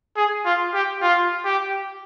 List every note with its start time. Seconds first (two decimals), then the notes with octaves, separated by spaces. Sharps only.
0.16 G#4
0.45 F4
0.74 G4
1.01 F4
1.44 G4